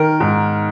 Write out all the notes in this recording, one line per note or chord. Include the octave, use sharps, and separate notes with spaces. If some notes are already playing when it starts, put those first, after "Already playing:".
Already playing: D#3 A#4
G#2